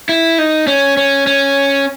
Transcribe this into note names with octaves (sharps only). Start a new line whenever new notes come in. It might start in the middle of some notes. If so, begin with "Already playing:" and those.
E4
D#4
C#4
C#4
C#4